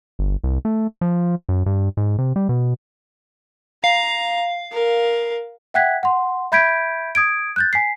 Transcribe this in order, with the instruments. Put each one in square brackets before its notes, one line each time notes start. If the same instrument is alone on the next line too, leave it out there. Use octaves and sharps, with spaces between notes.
[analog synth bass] G1
C2
A3
F3
F#2
G2
G#2
C3
G3
B2
[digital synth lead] F5 [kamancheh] A#5
[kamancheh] A#4
[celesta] E5 F#5 G5 F#6 G#6 B6
F#5 C6
E5 B5 G6 G#6 B6 D7
D#6 G#6 D7
F#6 G6 A6
G#5 B6 C7